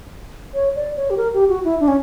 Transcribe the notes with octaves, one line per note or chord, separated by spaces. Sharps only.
C#5
D5
C#5
G4
A#4
G4
F#4
E4
D4
C#4